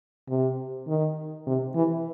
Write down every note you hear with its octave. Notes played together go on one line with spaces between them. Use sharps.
C3
D#3
C3
E3